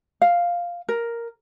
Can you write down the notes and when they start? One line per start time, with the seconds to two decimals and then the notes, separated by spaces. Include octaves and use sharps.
0.22 F5
0.89 A#4